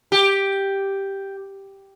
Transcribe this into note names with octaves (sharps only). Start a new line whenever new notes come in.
G4